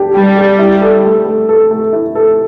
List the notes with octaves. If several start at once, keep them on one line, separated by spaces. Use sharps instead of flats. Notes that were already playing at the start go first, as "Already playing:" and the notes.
Already playing: D4 G4
G3 G4
G4
E4
A4
A3
A3
A4
A3
E4
A4